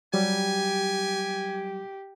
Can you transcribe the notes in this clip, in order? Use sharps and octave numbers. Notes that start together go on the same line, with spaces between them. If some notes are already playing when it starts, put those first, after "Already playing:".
F#3 G3 G4 G#5